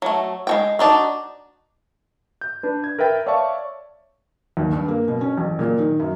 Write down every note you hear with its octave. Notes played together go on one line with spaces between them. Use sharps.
F#3 A3
G#3 F#4 G5
D4 D#4 F#4
G6
D4 B4
G#6
A#4 B4 E5 G5 A6
C#5 D5 E5 F5 A5 C#6
D#2
G2
A#3
B2
C#4
A1
A#2
D#3
F#2